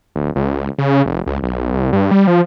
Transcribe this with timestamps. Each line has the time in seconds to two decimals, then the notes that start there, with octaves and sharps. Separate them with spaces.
0.16 D1
0.36 C#2
0.78 C#3
1.06 F1
1.27 C#2
1.43 B1
1.73 C2
1.93 G2
2.11 G3
2.27 F3